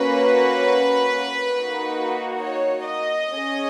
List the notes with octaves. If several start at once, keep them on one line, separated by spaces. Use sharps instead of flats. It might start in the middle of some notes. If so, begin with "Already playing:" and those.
Already playing: A#3 C#4 F#4 B4
A#3 D#4 F#4
C#5
D#5
C#4 G#4